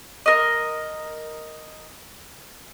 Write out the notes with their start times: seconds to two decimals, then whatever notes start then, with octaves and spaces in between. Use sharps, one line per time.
0.26 A#4 D#5